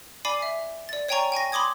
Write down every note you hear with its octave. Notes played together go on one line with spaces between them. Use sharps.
D5 G#5 B5 D6 C7
E5
D5 A6
C#5 D5 G5 G#5 A#5 C#6
G5 G#5 C#6 A#6
B5 C6 D6 D#6 G#6